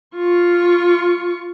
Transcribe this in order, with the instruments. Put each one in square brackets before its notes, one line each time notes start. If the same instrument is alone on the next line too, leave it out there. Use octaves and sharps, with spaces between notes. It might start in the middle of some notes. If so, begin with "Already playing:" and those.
[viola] F4 C#6